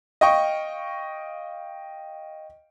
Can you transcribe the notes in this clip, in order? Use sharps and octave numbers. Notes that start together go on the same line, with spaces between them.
D#5 F5 G5 C#6